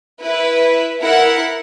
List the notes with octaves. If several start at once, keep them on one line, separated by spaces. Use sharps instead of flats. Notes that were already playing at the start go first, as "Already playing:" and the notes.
E4 B4
E4 A#4 F#5